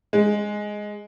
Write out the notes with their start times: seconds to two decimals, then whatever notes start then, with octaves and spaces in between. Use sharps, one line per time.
0.13 G#3